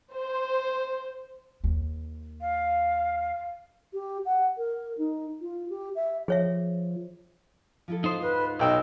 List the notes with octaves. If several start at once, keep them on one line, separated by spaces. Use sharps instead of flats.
C5
D#2
F5
G4
F#5
A#4
D#4
F4
G4
E5
F3 G#4 C#5 E5
F3 E4 A4
D#4 F4 C5 D#6
D2 G#2 B4 F5
B1 D#5 G5 E6